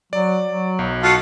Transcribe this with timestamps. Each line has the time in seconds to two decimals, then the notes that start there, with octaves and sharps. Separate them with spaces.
0.13 F#3 D5
0.49 F#3
0.79 B1
1.03 F4 F#4 A4 F#5